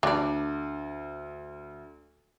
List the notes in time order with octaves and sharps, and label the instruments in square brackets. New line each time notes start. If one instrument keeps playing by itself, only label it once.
[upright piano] D2 [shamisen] D4 D5